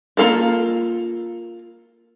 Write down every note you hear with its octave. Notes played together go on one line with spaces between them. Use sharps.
A#3 C4 F4 A4 A#4